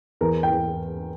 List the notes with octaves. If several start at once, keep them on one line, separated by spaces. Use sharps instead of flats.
E2 A#4
G5
E3